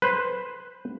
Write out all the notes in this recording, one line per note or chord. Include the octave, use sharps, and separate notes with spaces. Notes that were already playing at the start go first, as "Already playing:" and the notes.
B4 C5